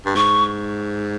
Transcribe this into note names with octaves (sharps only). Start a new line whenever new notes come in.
G2
G#2 C#6